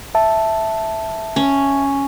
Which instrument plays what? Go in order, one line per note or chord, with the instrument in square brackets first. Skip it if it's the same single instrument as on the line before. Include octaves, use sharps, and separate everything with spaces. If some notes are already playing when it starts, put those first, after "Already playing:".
[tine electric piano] E5 A5
[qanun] C#4